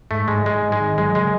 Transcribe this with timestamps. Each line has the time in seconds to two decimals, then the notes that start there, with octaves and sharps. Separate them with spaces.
0.11 G#2 A3
0.28 G#2 G#3
0.46 G#2 G#3
0.63 G#2
0.72 G#3
0.80 D#3
0.98 F#3 G#3
1.15 C#3 G#3